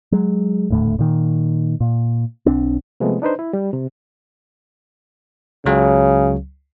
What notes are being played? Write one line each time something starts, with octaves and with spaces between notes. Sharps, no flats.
F#3 G#3
D#1 D2 A2 A3
A#2 D#3
A#2
B1 C4 D4
C3 F3 G#3 A3 B3
D4 D#4 B4 C5
E4
G3
C3
C#2 C#3 F#3